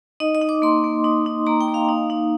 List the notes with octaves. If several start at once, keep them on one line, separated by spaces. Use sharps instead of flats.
D#4 D#5
D#5
D#4
D6
A#3 C6
A#3
D#4
D#4
A#3 A#5
G5
A#3
F5
D#4
D#4